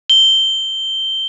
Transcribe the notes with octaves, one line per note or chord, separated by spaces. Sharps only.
G7